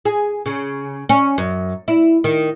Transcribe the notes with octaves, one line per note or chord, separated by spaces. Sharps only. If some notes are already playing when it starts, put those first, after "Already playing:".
G#4
C#3
C#4
F#2
E4
D#3